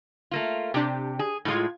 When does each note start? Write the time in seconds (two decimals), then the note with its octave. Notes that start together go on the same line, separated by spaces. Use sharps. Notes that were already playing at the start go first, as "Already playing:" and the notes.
0.31 A3 A#3 F4
0.74 C3 D4 G4
1.19 G#4
1.45 A2 G#3 F4 G#6